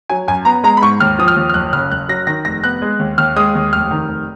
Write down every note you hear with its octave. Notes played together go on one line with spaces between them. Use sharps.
F#3 G#5
F#2 G#5
B3 A#5
G#3 A#5
B5
G#2 C#6
D#2 F6
F3 D#6
F6
D#2
F6
F#1 F#6
C#3 F6
F#1 F#6
F#3 A#6
D#3 A#6
F1 A#6
B3 F#6
G#3
D#2
D#2 F6
G#3 D#6
D#2
F1 F6
D#3
F1